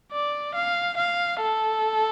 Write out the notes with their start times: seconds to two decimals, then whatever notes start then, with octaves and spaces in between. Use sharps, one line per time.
0.12 D5
0.55 F5
0.97 F5
1.41 A4